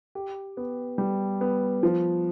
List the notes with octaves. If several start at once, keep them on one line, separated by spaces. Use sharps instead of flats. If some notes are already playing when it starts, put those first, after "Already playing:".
G4
B3
G3
B3
F3